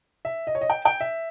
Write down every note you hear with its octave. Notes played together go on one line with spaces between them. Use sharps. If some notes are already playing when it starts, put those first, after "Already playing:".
E5
D#5
C#5
D#5
G5
G5
E5